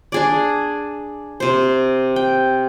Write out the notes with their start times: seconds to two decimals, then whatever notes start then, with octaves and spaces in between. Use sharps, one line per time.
0.12 D4 G#4 D5
1.40 C3 C5
2.16 G5